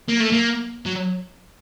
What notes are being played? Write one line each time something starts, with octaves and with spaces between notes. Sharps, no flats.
A#3
A3
A#3
F#3